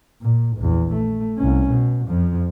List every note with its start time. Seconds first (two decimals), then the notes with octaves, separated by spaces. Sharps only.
0.21 A#2
0.57 A#1 E2
0.94 A3
1.37 C2 C#4
1.71 B2
2.07 F2 F3